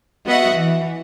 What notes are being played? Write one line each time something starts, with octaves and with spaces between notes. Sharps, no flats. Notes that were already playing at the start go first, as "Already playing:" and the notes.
B3 F#4 D#5 E5 F#5
E3